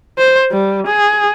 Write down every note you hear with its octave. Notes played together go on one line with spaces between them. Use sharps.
C5
G3
G#4